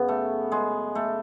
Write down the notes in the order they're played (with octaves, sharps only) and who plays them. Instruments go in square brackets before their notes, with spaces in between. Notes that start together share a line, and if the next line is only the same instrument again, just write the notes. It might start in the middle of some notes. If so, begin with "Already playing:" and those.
Already playing: [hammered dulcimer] F#2 C#3 B3
A3
G#3
A3